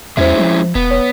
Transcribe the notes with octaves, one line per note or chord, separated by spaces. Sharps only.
E2 G#3 C#4 E4 C5 E5
F3
E1 B3
C#5